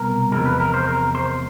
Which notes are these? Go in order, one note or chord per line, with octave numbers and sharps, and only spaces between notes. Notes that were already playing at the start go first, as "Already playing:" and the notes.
Already playing: C2 B2 F#3 A#4
E2 C3 F3 G#3 A#4
B4
A#4
C5
A#4
C5